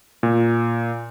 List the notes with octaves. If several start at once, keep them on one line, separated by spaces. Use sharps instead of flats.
A#2